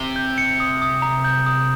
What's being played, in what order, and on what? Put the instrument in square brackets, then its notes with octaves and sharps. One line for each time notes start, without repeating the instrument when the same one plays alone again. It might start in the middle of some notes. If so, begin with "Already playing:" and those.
Already playing: [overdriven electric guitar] C3 [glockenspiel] G7
[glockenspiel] G6
C#7
D#6
D#6
A#5
G6
D#6